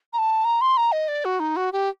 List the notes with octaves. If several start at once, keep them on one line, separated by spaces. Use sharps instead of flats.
A#5
A5
A#5
C6
A#5
D#5
D5
F#4
D#4
F#4
G4